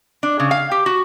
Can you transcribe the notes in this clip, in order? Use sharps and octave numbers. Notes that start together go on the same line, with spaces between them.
D4
C#3
F5
G4
F#4